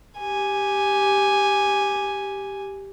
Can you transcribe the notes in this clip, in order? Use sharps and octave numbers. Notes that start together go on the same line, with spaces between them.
G4 G#5